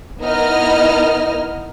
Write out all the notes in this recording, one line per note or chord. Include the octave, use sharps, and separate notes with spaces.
B3 D#4 E4 A#4 D#5 F6